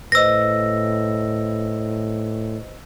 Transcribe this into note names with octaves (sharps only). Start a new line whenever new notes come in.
A2 B4 C5 D#5 E6 A#6